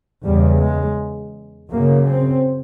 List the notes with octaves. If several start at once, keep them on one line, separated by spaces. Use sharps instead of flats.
E2 C#3 G3
G#3
F#2 C#3 A#3
C4